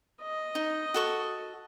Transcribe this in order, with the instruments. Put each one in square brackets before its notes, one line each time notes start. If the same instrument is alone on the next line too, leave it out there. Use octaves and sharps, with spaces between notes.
[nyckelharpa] D#5
[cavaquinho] D#4
F#4 A4 C#6